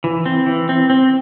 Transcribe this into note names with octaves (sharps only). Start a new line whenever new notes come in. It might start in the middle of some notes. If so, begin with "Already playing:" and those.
E3
C4
E3
C4
C4